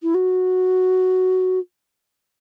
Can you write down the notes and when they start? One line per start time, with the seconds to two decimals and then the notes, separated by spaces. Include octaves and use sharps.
0.02 E4
0.14 F#4